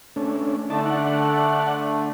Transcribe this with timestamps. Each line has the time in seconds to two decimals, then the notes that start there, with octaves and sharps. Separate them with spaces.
0.16 A3 C#4 D4
0.70 D3 A3 D#4 D5 A5
0.85 D5 F#5